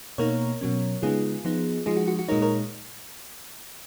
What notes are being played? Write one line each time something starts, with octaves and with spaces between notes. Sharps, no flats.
B2 A#3 D#4 A#4 C#5
B2 F#3 C#4
C#3 G#3 B3 D#4 F4 G#4
F3 B3 D#4
F3 G#3 D#4 F4 G#4
F#4
F#4
F#4
A#2 G#3 D#4 A#4 C#5
A#4 C#5